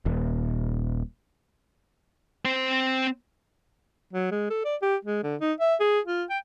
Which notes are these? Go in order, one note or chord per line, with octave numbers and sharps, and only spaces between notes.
D#1
C4 C5
F#3
G#3
A4
D5
G4
G#3
D3
D#4
E5
G#4
F4
G5